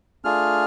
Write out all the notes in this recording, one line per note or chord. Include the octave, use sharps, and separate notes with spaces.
A3 D4 F4 G#4 F6